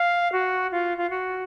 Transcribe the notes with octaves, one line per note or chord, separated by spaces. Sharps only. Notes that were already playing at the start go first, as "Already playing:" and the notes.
Already playing: F5
F#4
F4
F4
F#4